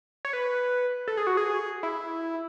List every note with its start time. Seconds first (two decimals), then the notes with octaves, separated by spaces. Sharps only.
0.25 C#5
0.33 B4
1.08 A4
1.17 G#4
1.27 F#4
1.37 G#4
1.83 E4